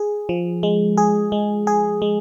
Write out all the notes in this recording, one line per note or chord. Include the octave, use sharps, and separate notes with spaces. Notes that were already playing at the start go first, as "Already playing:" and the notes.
Already playing: G#4
F3
G#3
G#4
G#3
G#4
G#3